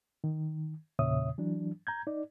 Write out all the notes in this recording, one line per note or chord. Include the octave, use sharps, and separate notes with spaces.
D#3
E2 A#2 C#3 C#5 E5 D#6
E3 F#3 D4
A#5 G6 G#6
D#4 D5